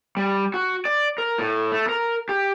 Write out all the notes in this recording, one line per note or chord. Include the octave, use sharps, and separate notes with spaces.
G3
F#4
D5
A#4
A2
A3
A#4
G4